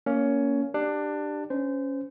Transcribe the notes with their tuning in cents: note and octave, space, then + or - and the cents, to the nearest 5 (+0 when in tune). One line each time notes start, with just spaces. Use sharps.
A#3 +0 C#4 +15
D4 +20 G4 +0
C#4 +0 C5 -25